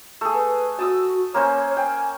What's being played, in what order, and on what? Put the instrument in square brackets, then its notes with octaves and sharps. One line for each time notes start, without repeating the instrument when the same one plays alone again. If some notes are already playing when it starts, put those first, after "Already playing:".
[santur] A3 G#4
[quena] B4
[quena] F#4 [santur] A5 D#6 E6
[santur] A#3 C#4 C5 [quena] C#5
[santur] G5 [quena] G#5